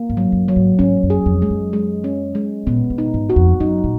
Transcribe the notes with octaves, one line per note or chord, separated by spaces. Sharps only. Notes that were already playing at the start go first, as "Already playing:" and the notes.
Already playing: A#3
G#2
F#3
F#2
F#3
G#2
G#2 C#4
F#2
G#4
F2
G#3
F#2
G#3
C#4
G#3
A#2 B3
B2
D#4
G#2
F#4
F2
F#2 D#4
A#2